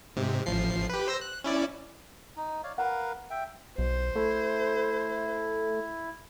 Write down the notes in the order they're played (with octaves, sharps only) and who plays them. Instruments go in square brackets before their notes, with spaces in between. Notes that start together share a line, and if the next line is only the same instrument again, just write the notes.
[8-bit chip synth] G#2 C3
A1 F3 C7
G4 B4
C5 E6 A#6
F#6
C#4 E4 D5
[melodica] D#4
C#5 D5 F5
[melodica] A#4 B4 F5 [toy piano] F#5 A#5
[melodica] E5 G5
[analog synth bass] B1 [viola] C5
[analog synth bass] A3 [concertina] E4